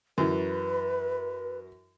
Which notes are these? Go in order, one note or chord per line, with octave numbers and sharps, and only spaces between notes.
F#2 E3 B4